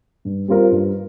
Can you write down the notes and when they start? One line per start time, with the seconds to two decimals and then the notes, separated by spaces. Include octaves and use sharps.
0.25 G2
0.48 G3 C4 F4 A#4
0.72 G2